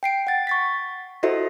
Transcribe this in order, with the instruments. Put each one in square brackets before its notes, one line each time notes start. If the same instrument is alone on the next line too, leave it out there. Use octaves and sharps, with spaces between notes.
[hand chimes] G5 C7 D7
F#5 A6
C#6 A6 B6
E4 F#4 A4 C5 D#5 E5